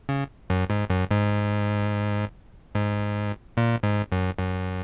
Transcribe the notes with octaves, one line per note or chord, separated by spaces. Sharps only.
C#3
F#2
G#2
F#2
G#2
G#2
A#2
G#2
F#2
F#2